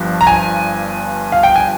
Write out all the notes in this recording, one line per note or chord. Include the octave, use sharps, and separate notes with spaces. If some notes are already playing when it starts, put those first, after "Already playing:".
Already playing: G1 G2 F3
A#5
G#5
F5
G5
G#5